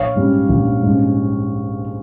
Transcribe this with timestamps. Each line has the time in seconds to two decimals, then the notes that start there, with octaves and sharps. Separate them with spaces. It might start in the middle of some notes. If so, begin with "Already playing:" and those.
Already playing: A#1 C#5 F5
0.15 G#2 G3 C#4
0.49 A#1
0.83 G#2 G3 C#4